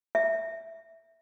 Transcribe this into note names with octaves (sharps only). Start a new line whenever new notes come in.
E5